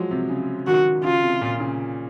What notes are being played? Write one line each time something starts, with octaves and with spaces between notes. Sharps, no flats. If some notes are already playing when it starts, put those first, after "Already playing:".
Already playing: F3 F#3 G#3
C3
C#3
D#3 F#4
C#3 F4
C3
A#2
C#3